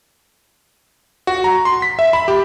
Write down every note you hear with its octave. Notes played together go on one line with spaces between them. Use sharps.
F#4
A#5
C6
B6
E5
B5
G4